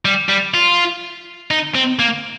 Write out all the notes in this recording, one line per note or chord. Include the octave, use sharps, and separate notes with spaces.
G3
G3
F4
D#4
C4
A#3